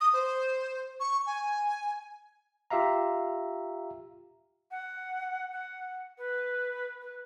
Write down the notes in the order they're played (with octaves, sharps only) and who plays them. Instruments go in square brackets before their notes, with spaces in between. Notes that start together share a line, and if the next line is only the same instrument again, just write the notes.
[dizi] D#6
C5
C#6
G#5
[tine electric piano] F4 G4 E5 F5 A#5
[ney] F#5
F#5
B4
B4